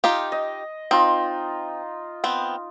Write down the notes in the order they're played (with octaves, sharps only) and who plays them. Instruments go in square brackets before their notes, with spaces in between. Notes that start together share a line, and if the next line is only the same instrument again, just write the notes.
[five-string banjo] D#4 F4 G4
[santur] D#5
[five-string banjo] C4 [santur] D#4 F4
[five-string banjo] B3 C4